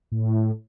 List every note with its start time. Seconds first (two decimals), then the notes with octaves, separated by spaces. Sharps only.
0.12 A2